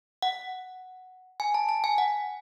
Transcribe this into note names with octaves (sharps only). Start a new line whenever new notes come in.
F#5
G#5
A5
A5
G#5
F#5